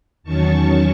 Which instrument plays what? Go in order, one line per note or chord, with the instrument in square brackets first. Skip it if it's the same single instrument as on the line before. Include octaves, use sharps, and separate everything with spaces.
[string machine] E2 D#3 F#3 C#4 A5 C#6